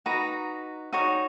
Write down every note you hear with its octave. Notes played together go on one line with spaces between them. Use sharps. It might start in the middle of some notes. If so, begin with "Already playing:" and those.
D#4 F#4 B4 A#5
D#4 F#4 C#5